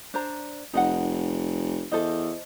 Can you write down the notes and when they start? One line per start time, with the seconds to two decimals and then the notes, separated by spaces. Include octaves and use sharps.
0.14 D4 C5 A#5
0.73 F1 D#4 D#5 F#5
1.91 E2 A4 C5 D#5